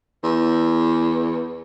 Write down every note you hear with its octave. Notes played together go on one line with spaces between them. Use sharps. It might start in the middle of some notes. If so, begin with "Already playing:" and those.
E2